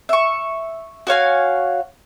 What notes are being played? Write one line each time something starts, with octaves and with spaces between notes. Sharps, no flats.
E5 C#6
F#4 C#5 F5 G#5